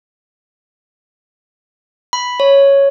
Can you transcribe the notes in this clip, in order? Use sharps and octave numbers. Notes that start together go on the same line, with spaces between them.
B5
C#5